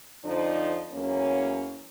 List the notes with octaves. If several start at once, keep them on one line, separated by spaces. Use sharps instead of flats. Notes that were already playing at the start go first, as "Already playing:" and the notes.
F2 D3 F3 D4 D#4 C5
E2 F#3 A#3 C#4